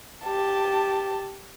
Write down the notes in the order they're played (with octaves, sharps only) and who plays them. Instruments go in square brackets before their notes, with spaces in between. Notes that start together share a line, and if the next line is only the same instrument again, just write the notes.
[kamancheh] G4 A5